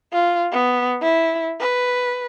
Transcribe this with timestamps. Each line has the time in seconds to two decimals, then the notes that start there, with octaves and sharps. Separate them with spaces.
0.13 F4
0.51 B3
1.02 E4
1.60 B4